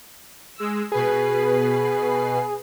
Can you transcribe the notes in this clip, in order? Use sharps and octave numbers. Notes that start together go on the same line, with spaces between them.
G#3 E6
B2 G#4 B4 C7